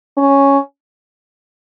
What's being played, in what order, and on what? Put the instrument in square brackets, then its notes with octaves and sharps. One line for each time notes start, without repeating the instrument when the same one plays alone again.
[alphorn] C#4